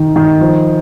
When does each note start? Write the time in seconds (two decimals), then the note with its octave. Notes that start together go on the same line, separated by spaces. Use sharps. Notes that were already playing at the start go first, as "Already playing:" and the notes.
Already playing: D#3 D#4
0.16 D#3
0.41 F3